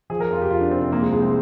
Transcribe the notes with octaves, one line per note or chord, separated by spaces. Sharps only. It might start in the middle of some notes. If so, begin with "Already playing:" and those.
F3 G#4
A#4
F2 F4
G4
F2 F4
D4
C3 C4
C4
F3 A#3
G#3
C2 G#3
C4